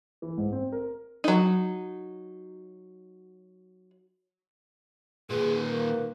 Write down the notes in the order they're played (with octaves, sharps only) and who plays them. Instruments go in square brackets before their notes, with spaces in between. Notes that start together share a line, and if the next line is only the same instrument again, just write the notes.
[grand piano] E3
G#2
C4
A#4
[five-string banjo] F#3 D#4
[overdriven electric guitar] A#2 D#3 [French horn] G#4 [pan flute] B4
[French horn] A#3